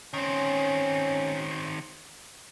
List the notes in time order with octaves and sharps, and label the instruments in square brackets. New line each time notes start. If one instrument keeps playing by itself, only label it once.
[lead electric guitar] D#3 C4 [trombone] C#4